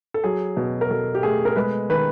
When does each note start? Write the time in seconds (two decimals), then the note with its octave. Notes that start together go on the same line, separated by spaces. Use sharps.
0.14 A4
0.24 F#3 G#4
0.57 B2
0.81 A#4
0.91 B2 A4
1.15 G4
1.23 A3 G#4
1.45 A#4
1.56 G#3 B4
1.89 D#3 B4